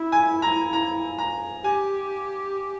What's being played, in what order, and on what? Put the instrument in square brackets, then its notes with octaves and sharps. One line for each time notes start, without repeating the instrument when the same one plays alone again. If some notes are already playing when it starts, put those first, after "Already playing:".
Already playing: [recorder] E4
[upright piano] G#5
A#5
A#5
A#5
[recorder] G4 [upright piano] G#5